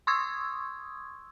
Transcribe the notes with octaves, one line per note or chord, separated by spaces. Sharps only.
C6 C#6 D#6 E6 G#6